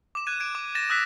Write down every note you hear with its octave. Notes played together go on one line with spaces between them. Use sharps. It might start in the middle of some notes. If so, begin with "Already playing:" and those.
D6 E7
F#6 G#6 D#7
G#6 D7
D6
A6 A#6 E7
D#6 E6 F#6 A#6 B6